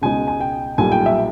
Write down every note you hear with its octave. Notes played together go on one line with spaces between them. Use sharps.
C#2 B2 G#3 D#4 G#5
G#5
G5
B1 A#2 G3 G#5
G5
E5